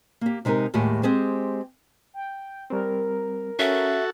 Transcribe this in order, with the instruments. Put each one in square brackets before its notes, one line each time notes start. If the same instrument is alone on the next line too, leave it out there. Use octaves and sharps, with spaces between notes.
[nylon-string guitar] A#3 G4
C3 G#3 D#4 G4 A#4
D#2 A2 G#3 G4 F#5 G#5
G#3 C4 G4 G#4 C5
[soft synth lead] G5
[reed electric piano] G3 C4 [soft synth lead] A#4
[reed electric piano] C#4 [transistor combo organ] F#4 A4 [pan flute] E5